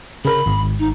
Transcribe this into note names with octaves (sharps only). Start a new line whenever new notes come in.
C#3 A#4 B5
G#1
D#4